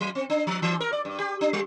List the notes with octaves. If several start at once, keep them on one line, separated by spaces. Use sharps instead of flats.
F#3
C4
D4
F3
E3
A#4
D5
G2
G4
D4
G3